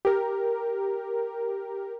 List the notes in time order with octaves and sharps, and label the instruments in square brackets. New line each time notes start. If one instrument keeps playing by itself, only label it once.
[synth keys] G4 A#4